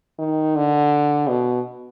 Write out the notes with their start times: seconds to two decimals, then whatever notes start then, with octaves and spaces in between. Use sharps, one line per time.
0.19 D#3
0.56 D3
1.28 B2